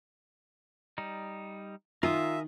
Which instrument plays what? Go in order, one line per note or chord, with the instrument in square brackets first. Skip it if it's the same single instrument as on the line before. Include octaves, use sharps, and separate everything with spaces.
[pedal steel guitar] G3 D#4
[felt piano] D#3 [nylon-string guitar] F4 [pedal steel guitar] A#4 G#5 D#6 [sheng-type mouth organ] E5